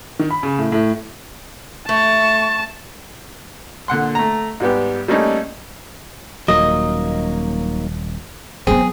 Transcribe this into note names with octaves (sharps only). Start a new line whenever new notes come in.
D#3
B5
C#3
A2
A2
A3 A5 C#6
A#2 D3 F#5 C6
A3 A#5
G#2 G3 B3 G4
G3 A3 A#3 C#4 D#4 A4
D#1 F#3 A#3 D#4 D#5
F#3 B3 C4 G#4